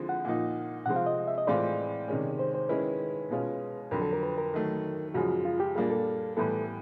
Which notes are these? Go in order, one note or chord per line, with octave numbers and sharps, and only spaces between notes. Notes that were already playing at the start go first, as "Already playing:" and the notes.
Already playing: D3 F3 G#3 C4 E4
F#5
A#2 F3 A#3 D#4
C3 F3 G#3 C4 F#5
F5
D#5
E5
D#5
A2 E3 G#3 C4 F4 D5
C3 D#3 G#3 C#4
C5
C5
D#3 G#3 C#4 E4 B4
B2 G#3 C#4 F4
F2 D3 F#3 A#4
A4
A#4
B4
A#4
D#3 F#3 A3
F#2 C#3 F3 G#3 F#4
F4
G4
A#2 G3 A#3 D4 G#4
A4
A2 E3 G3 B3 E4 A4